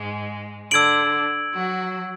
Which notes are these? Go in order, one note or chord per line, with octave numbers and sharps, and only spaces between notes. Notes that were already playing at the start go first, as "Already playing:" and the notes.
Already playing: G#2 G#3
D3 D4 E6 G#6 D7 F#7
F#3 F#4